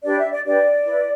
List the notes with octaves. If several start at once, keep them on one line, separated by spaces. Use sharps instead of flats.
D4 G4 B4 D5
E5
D5
D4 G4 B4 D5
E4 B4